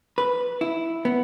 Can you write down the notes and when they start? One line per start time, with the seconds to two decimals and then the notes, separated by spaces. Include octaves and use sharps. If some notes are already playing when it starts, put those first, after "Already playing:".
0.18 B4
0.61 E4
1.05 B3